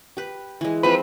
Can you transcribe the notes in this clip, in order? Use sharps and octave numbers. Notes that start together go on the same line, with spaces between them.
G4 B4
E3 G#3
F3 C4 B4 C5